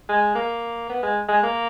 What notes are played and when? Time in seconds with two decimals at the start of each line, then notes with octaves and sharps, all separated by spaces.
0.09 G#3
0.35 A#3
0.90 B3
1.03 G#3
1.29 G#3
1.43 A#3